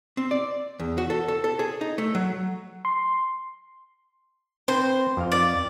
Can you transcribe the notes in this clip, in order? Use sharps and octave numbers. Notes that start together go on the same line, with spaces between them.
C4
D5
E2
F#4
A4
A4
A4
G#4
D#4
A3
F#3
C6
C4 B4 C5 C6
F2 F5
D5